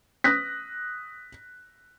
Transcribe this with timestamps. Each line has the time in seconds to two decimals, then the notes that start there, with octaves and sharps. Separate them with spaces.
0.24 D#6 F#6 A#6 B6